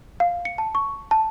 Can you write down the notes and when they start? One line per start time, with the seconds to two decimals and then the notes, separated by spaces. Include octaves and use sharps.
0.20 F5
0.45 C#7
0.58 A5
0.75 C#6
1.11 A5